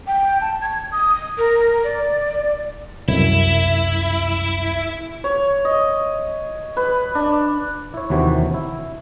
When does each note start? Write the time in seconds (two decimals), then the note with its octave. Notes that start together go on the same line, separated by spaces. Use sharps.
0.07 G5
0.41 A5
0.62 G#6
0.92 D#6
1.38 A#4
1.84 D5
3.08 C2 F#2 E4
5.24 C#5
5.65 D#5
6.77 B4
7.15 D4
7.94 E4 C#5
8.10 D#2 C3 E3 F#4 C#5
8.54 E4